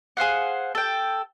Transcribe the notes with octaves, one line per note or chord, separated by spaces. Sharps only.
G#4 C5 F5 F#5
A4 G5